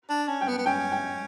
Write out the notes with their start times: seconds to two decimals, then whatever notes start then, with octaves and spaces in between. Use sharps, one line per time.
0.10 D4
0.28 C#4
0.41 G5
0.48 B3
0.58 B3
0.66 C#4 G5
0.92 G5